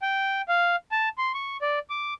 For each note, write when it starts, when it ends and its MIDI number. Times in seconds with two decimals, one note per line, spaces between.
0.02 0.42 79
0.48 0.76 77
0.92 1.09 81
1.18 1.32 84
1.34 1.57 85
1.62 1.79 74
1.90 2.14 86